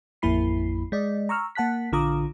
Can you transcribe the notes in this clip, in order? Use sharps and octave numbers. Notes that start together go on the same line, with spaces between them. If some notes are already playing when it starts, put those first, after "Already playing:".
A1 F2 A#3 E4 B5 C7
G#3 D5 D#5
A#5 C#6 E6 F6
A#3 F#5 A5 F#6 B6
A#1 D3 F4 A#5 D6 D#6